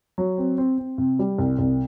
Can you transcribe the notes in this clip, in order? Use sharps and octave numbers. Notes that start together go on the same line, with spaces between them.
F#3
C4
C4
C4
C3
G3
C2
C2